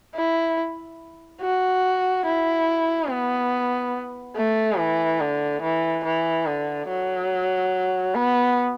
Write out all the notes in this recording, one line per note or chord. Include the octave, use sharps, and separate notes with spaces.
E4
F#4
E4
B3
A3
E3
D3
E3
E3
D3
F#3
B3